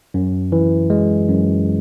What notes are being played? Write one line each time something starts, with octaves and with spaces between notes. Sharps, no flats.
F#2
E3
G#3
F#2